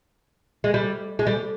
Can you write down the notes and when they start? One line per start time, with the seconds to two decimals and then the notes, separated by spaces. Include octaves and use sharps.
0.64 G#3
0.74 G3
1.19 G#3
1.27 G3